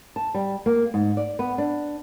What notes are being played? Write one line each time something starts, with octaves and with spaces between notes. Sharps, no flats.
A5
G3
A#3
G#2
D5
B3
D4